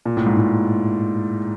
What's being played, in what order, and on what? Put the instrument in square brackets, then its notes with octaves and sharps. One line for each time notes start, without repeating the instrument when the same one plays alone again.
[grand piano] A#2
A2
G#2
A2